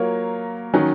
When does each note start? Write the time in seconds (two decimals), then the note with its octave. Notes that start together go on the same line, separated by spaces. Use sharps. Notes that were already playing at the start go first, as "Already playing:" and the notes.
Already playing: F#3 A#3 F4 A#4 C#5
0.74 D#3 F#3 C#4